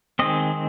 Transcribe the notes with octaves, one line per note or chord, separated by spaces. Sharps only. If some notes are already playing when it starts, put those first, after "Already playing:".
D#3 G#3 C4 D#5